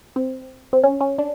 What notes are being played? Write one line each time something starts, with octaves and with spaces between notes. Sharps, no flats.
C4
C4
C#4
C#4
D4